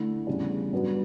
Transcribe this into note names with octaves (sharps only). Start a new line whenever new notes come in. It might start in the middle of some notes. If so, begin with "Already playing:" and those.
Already playing: D3 A3 E4
E2 C#3 G3 D4
G2 F#3 B3 D4